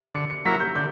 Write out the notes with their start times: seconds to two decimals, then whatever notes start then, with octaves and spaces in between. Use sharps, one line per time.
0.14 D3 C#7
0.30 C#7
0.45 F#3 A#3 E4 A#4 B6
0.59 G6
0.75 D3 G6